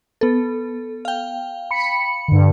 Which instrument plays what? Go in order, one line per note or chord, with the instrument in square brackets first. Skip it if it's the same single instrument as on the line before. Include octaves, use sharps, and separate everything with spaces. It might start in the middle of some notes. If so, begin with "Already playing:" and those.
[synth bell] B3 A4
F5 G5
[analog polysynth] B5 C#7
G2 D3